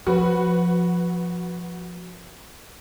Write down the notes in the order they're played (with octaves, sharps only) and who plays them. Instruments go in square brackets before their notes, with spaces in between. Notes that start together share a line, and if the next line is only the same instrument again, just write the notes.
[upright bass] F3 [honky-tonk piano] F#4 B4